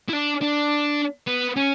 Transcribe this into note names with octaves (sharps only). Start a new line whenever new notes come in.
E4
D4
D4
B3
C#4